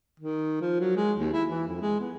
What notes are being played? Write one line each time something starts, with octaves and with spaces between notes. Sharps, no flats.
D#3
F3
F#3
G#3
D#2
E4
E3
F2
G#3
B3